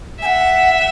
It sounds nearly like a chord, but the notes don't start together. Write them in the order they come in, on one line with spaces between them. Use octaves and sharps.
E5 G#5 F#5